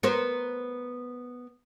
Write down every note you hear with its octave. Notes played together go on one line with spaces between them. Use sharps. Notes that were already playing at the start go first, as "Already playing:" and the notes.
B3 A#4 C5